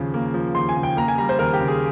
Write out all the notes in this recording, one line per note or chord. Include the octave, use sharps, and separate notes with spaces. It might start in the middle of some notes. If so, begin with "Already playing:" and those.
Already playing: D#2 C#3 F3
A#3
F3
D#2 C6
G#5
C#3
G5
A#3 A#5
G#5
G3 A#5
C5
D#2 A#4
G4
C#3
G#4